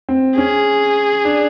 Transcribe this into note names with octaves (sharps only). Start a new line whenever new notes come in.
C4
C#4 G#4
D4